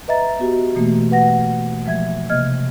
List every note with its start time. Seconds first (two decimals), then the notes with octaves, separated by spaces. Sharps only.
0.08 B4 D#5 E5 A#5 A6
0.39 B3 F#4 G4
0.76 B2 E3 A3 A#3
1.11 B4 F#5 A#6
1.86 F3 G#3 E5 G#6
2.30 C3 A#3 D#5 F6 G#6